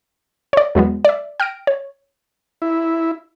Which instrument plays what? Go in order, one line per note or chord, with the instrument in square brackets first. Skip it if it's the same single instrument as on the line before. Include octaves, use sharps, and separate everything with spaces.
[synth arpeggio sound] C#5 D5
E2 F#3 G#3 B3
D5 E5
G5 F6 A#6 D7
C#5
[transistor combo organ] E4